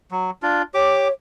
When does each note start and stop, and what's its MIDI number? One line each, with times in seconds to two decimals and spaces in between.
0.11 0.30 54
0.42 0.62 62
0.42 0.62 65
0.74 1.08 67
0.74 1.12 73
0.74 1.08 86